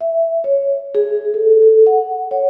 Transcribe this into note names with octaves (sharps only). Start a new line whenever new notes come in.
E5
C#5
G#4
A4
A4
F#5
C#5